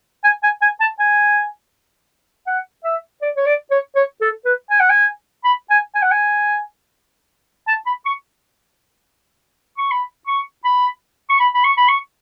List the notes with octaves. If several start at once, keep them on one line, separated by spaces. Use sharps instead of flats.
G#5
G#5
G#5
A5
G#5
F#5
E5
D5
C#5
D5
C#5
C#5
A4
B4
G#5
F#5
G#5
B5
G#5
G#5
F#5
G#5
A5
B5
C#6
C#6
B5
C#6
B5
C#6
B5
B5
C#6
B5
C#6